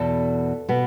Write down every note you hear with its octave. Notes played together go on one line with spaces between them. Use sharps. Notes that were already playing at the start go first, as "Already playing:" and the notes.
Already playing: E2 B2 B3 A4
B2 B3